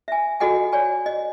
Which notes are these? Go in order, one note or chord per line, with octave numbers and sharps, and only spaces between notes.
E5 G#5
F#4 A4 D#5 F#5 G#5
C#5 D5 G#5
D#5